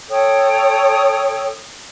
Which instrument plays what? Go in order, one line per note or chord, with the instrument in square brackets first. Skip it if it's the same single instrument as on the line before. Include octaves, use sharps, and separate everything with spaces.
[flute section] A4 C#5 G5 D#6